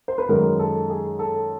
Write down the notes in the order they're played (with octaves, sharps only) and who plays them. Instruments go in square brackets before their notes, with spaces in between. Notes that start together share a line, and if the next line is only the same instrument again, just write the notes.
[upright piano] C5
B4
F#2 D#3 G#3 A#4
A4
G#4
A4